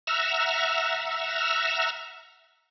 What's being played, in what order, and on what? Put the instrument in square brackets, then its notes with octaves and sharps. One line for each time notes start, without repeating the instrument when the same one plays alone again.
[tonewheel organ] E5 F#5 A#5 E6 F6